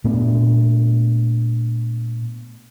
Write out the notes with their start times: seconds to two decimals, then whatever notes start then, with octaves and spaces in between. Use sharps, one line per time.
0.04 A#2 A3 B3 D4